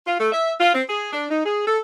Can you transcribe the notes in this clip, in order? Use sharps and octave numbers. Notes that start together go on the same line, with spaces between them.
F4
A3
E5
F4
C4
G#4
D4
D#4
G#4
A4